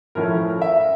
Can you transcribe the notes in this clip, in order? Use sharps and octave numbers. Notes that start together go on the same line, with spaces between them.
A2 F3 A3 C#4 E4 A#4
E5